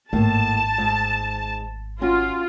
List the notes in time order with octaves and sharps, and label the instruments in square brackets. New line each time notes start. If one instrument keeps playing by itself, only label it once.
[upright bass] G#1 [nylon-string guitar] A2 A#3 [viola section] A5
[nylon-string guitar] G#2
[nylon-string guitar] C#4 F#4 [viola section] F4